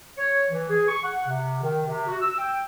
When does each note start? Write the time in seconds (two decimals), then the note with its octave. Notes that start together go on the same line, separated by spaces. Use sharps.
0.16 C#5
0.50 E3
0.69 G#4
0.88 C#6
1.03 F#5
1.26 C3
1.62 D#3
1.86 C3
2.07 F#4
2.20 E6
2.37 G5